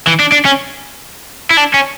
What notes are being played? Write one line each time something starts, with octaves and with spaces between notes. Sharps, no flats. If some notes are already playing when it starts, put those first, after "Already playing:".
E3
D4
D4
C#4
E4
D4
C#4